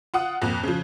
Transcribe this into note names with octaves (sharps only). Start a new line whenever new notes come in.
F4 F#5 D#6
F2 A#2 F#6
C#3 F3